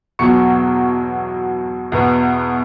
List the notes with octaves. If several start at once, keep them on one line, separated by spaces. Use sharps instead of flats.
E2 B2 F#3 C#6 C#7
E2 B2 B3